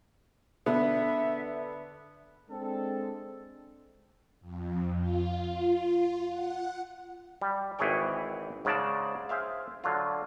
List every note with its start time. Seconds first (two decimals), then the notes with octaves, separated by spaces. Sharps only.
0.66 D3 B3 E5
2.50 G#3 C4 D4 A4
4.41 F2
4.99 F4
6.30 F#5
7.42 G3
7.79 G#1 E3 E4 G#4 C#5 G5
8.65 G#2 C#3 G#3 D5 A5
9.29 G#4 C5 E5 F5
9.84 D3 F#3 F4